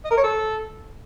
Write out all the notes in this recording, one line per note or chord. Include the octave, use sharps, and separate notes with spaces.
D#5
A#4
C#5
A4